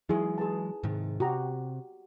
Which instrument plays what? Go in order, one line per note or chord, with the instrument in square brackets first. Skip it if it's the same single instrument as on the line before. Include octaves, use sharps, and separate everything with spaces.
[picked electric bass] E3 F#3 G#3 [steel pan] D#4 E4 G#4
[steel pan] G#4 B4 A5
[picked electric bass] G#2 C3 D#3
[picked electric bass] C3 [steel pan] F#4 G4 A#5